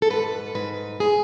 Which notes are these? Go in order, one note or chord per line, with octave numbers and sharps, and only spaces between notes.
A4
G#2 B4
G#2 B4
G#4